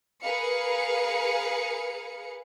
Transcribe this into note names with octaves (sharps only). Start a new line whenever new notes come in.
G#4 A#4 B4 F5 C#7